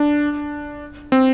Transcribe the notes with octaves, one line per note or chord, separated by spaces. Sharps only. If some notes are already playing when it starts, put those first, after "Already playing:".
Already playing: D4
C4